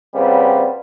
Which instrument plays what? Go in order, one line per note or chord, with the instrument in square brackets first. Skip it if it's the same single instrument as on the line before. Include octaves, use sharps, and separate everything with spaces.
[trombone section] A#2 C#3 G3 B3 C4